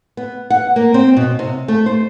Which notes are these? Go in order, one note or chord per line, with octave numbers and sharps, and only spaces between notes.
B3
F#5
A#3
C4
B2
C3
A3
C5